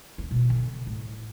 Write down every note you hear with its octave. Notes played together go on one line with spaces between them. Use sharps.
C#4
B2
D3
A2